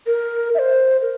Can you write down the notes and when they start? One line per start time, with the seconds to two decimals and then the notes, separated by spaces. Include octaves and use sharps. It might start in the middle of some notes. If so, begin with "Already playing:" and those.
0.07 A#4
0.55 E5
0.59 C5
1.02 A#4